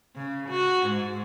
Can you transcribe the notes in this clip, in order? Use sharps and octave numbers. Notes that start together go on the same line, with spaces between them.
C#3
F#4
G#2